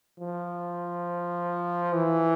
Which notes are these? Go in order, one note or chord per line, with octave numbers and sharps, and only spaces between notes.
F3
E3